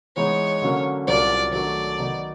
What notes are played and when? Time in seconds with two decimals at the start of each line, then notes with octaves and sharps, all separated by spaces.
0.16 E3 G#3 B3 D#4 C#5
0.62 D3 F#3 A#3 C#4
1.07 C2 A#2 F#3 A#3 D5
1.52 D#3 F#3 A3 D4 D5
1.98 D#3 F#3 B3 D#4